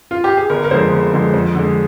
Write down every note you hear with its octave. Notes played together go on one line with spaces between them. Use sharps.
F4
G4
G#4
G1 A#4
A#4
F2 D3 G#3 C5
G1
F2 D3 G#3
F2
D3 G#3